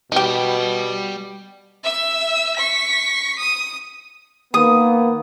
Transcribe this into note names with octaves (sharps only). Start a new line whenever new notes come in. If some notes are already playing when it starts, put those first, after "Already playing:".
B2 G3 D#4 G4
E5 E6
C#6 B6
D#6
D#3 A#3 B3 D#6